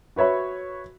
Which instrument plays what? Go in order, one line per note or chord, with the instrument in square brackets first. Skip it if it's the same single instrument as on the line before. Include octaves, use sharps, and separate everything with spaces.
[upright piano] F#4 B4 C#5 E5 B5